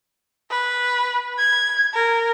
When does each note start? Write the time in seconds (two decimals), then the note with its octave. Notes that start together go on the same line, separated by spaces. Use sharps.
0.51 B4
1.39 G#6
1.94 A#4